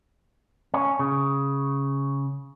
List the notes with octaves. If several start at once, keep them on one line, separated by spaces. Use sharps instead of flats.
C#4
C#3